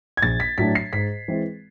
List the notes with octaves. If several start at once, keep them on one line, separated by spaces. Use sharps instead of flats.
G#6
A#1 A6
B6
A2 F#3 A3 D4 B6
C7
G#2 B6
E3 G#3 C4